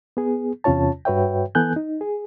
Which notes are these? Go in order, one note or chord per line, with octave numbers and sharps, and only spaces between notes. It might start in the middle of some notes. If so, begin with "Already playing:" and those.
B3 G#4
E2 C3 C#4 F4 C#5 A5
G2 F#4 B4 C#5 E5 G5
E3 B3 A4 G#5 F#6 G6
D#4
G#4